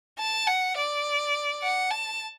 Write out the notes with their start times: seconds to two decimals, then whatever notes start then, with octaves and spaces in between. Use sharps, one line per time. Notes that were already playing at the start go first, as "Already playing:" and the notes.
0.19 A5
0.47 F#5
0.77 D5
1.63 F#5
1.91 A5